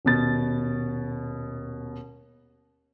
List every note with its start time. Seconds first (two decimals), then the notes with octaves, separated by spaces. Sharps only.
0.05 D#1 B2 A6